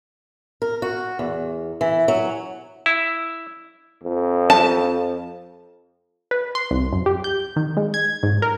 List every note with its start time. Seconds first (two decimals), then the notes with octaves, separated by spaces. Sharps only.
0.62 A#4
0.82 F#4
1.19 E2
1.81 E3
2.08 F#3
2.86 E4
4.03 F2
4.50 A5
6.31 B4
6.55 C6
6.71 C2
6.93 F#2
7.06 G4
7.24 G6
7.56 D#3
7.77 G#3
7.94 G#6
8.23 G#2
8.42 A#4